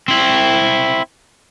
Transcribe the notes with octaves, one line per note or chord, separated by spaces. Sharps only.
C4 E4